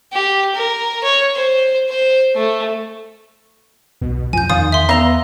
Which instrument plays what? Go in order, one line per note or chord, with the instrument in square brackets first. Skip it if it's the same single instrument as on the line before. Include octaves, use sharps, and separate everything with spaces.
[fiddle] G4
A#4
C#5
C5
C5
A3
[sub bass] B1 [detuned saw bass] B2
[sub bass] F2 [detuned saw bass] F3 [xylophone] G#5 G6
[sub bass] E2 [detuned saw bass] D#3 [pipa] F4 [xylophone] D#6
[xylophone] E5 C6
[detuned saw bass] B3 [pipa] E5 A#5 [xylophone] F5 F7 G7